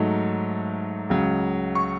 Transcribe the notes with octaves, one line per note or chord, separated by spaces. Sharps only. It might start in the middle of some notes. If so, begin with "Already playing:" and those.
Already playing: G#2 F#3 A3 D#4
C#2 C#3 F#3
C#6